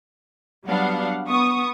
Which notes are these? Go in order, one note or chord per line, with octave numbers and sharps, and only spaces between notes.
F#3 G3 B3 D4 F5 F#5
B3 C#6 D#6